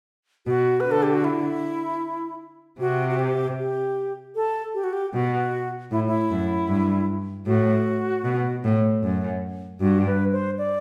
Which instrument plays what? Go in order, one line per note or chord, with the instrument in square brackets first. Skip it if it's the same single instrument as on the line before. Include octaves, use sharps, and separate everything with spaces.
[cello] B2 [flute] F#4
[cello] D3 [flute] B4
[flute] A4
G4
F#4
E4
[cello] C3 [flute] F#4
[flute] F#4
G4
G4
A4
G4
F#4
G4
[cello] B2 [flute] F#4
[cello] A2 [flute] E4
[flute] E4
[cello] F#2
G2
[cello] A2 [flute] F#4
[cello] B2
A2
F#2
[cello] G2 [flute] F#4
[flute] B4
C5
D5